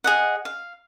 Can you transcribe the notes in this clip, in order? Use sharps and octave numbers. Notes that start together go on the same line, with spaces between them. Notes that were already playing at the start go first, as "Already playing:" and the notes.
G#4 D#5 F#5
F5